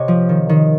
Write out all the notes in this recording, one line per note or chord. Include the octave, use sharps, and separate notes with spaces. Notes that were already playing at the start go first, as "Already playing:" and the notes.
Already playing: C3 C#5 D#5
F3
D#3
D#3